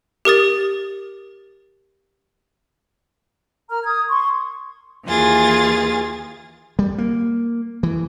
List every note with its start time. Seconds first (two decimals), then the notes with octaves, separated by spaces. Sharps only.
0.25 G4 A#4 D#6 A6
3.69 A#4 A#5 F6
3.84 D#6 G#6
4.09 C6 C#6
5.06 D#2 E3 F4 G#4 A6
6.79 G3
6.98 A#3
7.83 E3